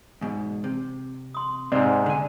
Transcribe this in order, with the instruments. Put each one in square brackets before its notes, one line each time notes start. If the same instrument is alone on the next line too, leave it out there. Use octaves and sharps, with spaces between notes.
[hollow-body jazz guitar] E2 G#2 B2
C3
[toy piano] C6 D#6
[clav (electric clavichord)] G#2 C3 [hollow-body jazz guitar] C4 [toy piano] D5
[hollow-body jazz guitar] D3 G#5